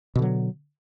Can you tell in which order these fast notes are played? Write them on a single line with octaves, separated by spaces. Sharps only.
B2 D3 F#3